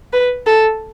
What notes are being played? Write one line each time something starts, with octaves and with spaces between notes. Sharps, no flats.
B4
A4